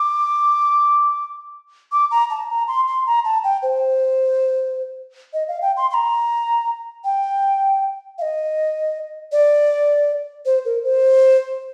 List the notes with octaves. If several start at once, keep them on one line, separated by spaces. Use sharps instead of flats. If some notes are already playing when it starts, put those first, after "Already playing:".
Already playing: D6
D6
A#5
A5
A#5
C6
C6
A#5
A5
G5
C5
D#5
F5
G5
C6
C6
A#5
G5
F5
D#5
D5
C5
A#4
C5